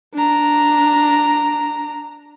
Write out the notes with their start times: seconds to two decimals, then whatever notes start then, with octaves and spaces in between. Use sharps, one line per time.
0.15 D4 A#5